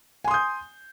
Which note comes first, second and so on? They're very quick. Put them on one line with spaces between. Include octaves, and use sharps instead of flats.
G#5 C6 D#6 G6